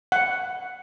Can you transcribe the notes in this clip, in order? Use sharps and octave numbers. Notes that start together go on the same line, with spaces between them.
F#5